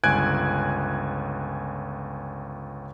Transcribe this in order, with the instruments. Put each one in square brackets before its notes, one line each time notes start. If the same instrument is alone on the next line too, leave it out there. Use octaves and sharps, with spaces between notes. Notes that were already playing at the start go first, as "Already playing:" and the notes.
[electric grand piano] G1 C#2 G#5 F#6 G#6 D7